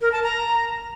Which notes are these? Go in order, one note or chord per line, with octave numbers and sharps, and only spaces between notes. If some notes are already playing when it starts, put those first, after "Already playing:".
A#4
A5
A#5